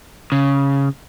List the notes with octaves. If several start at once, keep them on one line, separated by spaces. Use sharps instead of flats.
C#3